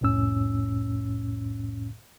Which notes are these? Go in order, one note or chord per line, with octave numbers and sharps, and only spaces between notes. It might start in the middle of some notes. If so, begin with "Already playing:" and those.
C2 F2 A2 C#4 E6